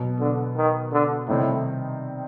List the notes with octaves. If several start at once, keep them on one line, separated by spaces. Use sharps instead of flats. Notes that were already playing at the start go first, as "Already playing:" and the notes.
Already playing: B2 F#3 B3
D3
D#3
D3
A2 C3 D#3 G3 C4 D#4